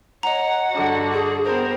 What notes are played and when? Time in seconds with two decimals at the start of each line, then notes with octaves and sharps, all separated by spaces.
0.23 C#5 D#5 F#5 A#5
0.71 G2 D3 F#4
1.13 G#4
1.44 B3 C4 A#4 C5